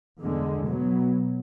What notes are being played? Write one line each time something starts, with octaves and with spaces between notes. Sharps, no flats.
E2 D3 G#3
B2 F#3 B3